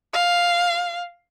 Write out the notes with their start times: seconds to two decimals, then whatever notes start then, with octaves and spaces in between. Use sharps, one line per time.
0.13 F5